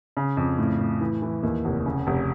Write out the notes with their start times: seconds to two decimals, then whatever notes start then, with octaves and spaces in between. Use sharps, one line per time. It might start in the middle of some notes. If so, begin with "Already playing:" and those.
0.17 C#3
0.37 F2
0.59 A2
0.80 A2
1.01 E3
1.22 E3
1.43 D#2
1.65 F1
1.86 C#3
2.07 F1